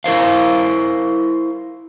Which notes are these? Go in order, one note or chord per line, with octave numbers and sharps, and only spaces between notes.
E4 A#4 C5 F5